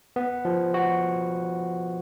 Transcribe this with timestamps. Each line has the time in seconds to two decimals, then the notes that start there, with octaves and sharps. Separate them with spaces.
0.16 B3
0.45 F3
0.74 F#4